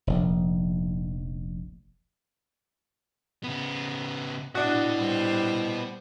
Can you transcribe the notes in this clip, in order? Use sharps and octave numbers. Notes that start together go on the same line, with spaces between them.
F1 A#1
C#3 B3
A2 B3 D4 F#4 D#5
G3 C5